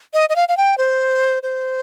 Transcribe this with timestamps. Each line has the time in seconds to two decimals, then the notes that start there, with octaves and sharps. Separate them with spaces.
0.14 D#5
0.29 D#5
0.36 F5
0.49 F5
0.57 G5
0.78 C5
1.43 C5